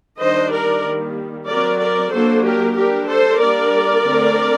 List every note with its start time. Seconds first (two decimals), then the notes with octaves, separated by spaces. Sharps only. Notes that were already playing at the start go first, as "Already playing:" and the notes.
0.20 D#3 G3 D4 C5 D#5
0.52 A#4 D5
0.84 D#3 G3 A#3
1.48 F#3 C4 A#4 D5
1.80 A#4 D5
2.12 F#3 A#3 D4 A4 C5
2.45 G4 A#4
2.76 G3 D4 G4 A#4
3.08 A4 C5
3.39 G3 A#3 D4 A#4 D5
4.03 D3 A3 C4